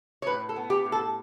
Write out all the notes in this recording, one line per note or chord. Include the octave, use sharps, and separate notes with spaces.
C#5
A2 B4
A4
B3
G4
A2
A4